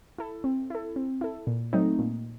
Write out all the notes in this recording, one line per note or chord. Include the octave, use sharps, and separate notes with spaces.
E4 A4
C4
E4 A4
C4
E4 A4
A#2
F#3 A3 C4 D#4
A#2